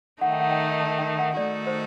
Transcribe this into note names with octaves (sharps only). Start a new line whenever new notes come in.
D#3 A3 D#4 F#5
G5
F#5
G5
A5
G5
F#5
D#3 A3 D#4 F#4 A4 D5
C5